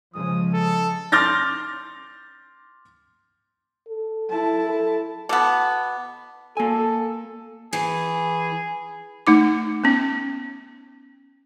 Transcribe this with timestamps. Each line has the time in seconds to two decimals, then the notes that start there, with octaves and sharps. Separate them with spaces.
0.15 C#3 F3 G#3 D#6
0.53 A4
1.12 C6 D6 F6 G6 A6 A#6
3.88 A4
4.29 E4 A5
4.70 A4
5.29 B2 B3 A5 D6
6.57 A#3 A4 G#5
7.73 E3 G#4 B4
9.27 A3 D#4 D6
9.84 B3 C#4